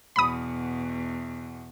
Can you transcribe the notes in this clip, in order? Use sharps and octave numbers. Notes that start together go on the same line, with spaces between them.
E2 B2 B5 D#6